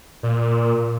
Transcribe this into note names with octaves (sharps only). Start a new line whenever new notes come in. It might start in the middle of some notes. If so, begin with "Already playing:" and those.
A#2